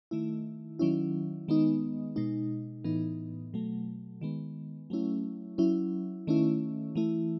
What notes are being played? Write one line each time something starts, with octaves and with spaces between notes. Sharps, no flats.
D#3 A3 E4
D#3 F#3 C#4 E4
D#3 G#3 B3 D#4
B2 G#3 D#4
A2 E3 B3 D#4
B2 F#3 A3
D#3 G#3 B3
F#3 A3 C#4 E4
F#3 C#4 E4
D#3 A3 C#4 E4
E3 A3 E4